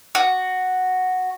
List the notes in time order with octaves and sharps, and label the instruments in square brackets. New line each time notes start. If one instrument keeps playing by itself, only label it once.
[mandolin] F#4